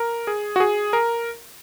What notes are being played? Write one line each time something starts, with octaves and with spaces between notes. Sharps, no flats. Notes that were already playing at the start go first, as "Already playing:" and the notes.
Already playing: A#4
G#4
F#4
G#4
A#4